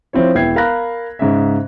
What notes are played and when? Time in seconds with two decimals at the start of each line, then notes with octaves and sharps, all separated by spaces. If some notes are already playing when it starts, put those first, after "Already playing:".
0.13 F3 C4 E4 C#5
0.35 E1 E4 B4 G5 G#6 C7
0.56 A#4 F5 A#5 B5 F#6 A#6
1.19 G#2 C#3 E5